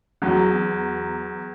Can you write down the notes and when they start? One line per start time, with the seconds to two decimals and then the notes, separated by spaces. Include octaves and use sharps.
0.22 E2 F#3